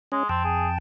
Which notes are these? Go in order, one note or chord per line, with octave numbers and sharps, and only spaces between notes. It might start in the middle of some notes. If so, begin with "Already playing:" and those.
G#3 C#4
F2 C4 G5 A5
G#4